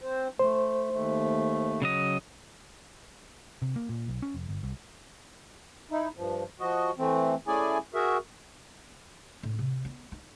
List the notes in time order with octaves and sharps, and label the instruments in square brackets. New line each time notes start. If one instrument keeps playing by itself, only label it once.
[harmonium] C4 C5
[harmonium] A3 [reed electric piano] C5
[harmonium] D#2 A3
[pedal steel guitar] C#3 F#3 D#5
[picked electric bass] C3
A#3
A#2
B1
C#4
F1
G1
C2
[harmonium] D#4 E4
G2 F3
F3 F#4 D#5
E3 A3 C4
A3 C#4 E4 G#4 D5 G#5
F#4 G#4 A#4 E5
[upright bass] A2
C3
B3
D#4